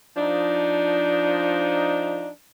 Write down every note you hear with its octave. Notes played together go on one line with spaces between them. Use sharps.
F3 D4 D#4